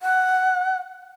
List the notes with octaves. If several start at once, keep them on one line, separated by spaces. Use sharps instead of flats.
F#5